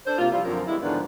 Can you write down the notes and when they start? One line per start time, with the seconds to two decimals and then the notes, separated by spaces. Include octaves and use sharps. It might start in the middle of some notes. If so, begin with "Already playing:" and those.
0.07 D4 A4 C5
0.19 C3 A#3 F4
0.32 F3 G3 E4 F4
0.45 F#2 D3 F3 C4 C#4 A#4
0.68 E3 G3 G#3 B3 E4
0.82 G#2 D3 D#3 F3 B3 D4